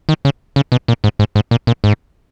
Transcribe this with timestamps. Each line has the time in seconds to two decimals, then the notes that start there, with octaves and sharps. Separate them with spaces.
0.09 D#3
0.25 C#3
0.56 C#3
0.72 B2
0.88 A#2
1.04 G#2
1.19 G#2
1.36 G#2
1.51 A#2
1.67 A#2
1.84 G#2